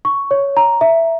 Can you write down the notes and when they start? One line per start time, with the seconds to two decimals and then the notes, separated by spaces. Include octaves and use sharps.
0.05 C#6
0.31 C#5
0.57 A#5
0.81 E5